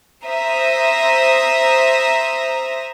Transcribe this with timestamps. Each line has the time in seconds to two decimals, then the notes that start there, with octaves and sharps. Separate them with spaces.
0.25 C5 E5 A#5 D#6